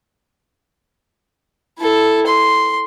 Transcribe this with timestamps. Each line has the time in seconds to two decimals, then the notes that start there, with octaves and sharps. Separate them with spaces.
1.78 E4 A4
2.27 C6